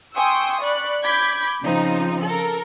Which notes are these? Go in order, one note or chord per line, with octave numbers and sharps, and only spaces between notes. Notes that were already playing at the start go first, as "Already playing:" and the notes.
G5 G#5 C6 C#6 D#6 E6
D5 B5 C#6 F#6
B5 D6 G6 G#6 B6
C#3 F3 C4 D#4
A4 A#4